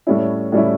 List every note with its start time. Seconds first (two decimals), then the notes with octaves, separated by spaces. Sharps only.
0.07 A2 G3 C#4 E4
0.52 A2 G3 C#4 E4